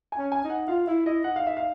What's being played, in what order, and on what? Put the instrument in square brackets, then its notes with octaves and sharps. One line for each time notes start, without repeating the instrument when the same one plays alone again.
[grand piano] G#5
[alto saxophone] C#4
[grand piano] G#5
[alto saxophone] D#4
[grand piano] F#5
[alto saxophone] F4 [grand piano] F5
[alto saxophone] E4 [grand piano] E5
[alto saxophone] E4 [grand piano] D#5
[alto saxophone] D#4 [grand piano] F#5
[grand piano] F5
E5
F5